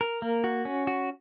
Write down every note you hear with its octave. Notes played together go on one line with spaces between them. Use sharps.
A#4
A#3
F#4
C#4
F#4